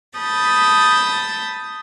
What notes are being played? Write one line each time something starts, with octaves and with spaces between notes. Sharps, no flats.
A5 B5 D#6 G6 A6